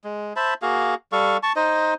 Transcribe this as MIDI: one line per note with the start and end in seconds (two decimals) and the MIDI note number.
0.04 0.33 56
0.36 0.54 72
0.36 0.54 76
0.36 0.54 81
0.36 0.54 83
0.62 0.95 58
0.62 0.95 66
0.62 0.95 68
0.62 0.95 77
1.12 1.37 55
1.12 1.37 69
1.12 1.37 77
1.12 1.37 85
1.43 1.52 81
1.43 1.52 85
1.56 1.94 63
1.56 1.94 72
1.56 1.94 75